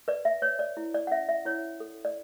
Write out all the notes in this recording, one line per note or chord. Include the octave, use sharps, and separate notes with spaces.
B4 D5
E5
B4 C#5
D5
E4
D5
F#5
C#4 E5
E5
E4 C#5
A4
D5